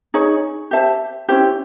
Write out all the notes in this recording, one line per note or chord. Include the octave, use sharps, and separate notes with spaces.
D#4 G#4 C#5
G4 C5 E5 A5
C#4 E4 G4 C5